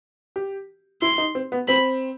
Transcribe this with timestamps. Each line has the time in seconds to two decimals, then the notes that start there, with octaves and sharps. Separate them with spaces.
0.36 G4
1.02 E4 C6
1.18 D#4
1.35 C4
1.52 B3
1.68 C4 B5